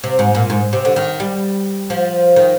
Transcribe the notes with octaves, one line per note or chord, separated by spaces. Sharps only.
C3
G#2
A#2
G#2
C3
D3
D#3
G3
F3
D#3